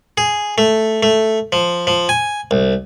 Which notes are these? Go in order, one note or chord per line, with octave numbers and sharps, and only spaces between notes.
G#4
A3
A3
F3
F3
G#5
C2